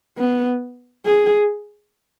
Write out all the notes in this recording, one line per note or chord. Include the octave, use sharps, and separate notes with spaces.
B3
G#4